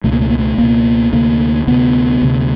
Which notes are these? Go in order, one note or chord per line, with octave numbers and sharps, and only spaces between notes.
C#2 B2 A3
A#3
A3
A#3
A3
C#2 B2 A#3
D2 C3 A#3
D2 C3 B3
D2 C3